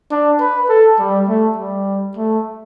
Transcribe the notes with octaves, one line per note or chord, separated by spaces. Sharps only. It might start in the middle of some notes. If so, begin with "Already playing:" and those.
D4
B4
A4
G3
A3
G3
A3